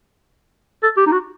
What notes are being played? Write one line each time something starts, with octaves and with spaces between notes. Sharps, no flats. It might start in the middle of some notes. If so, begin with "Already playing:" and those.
A4
G4
D#4
F#4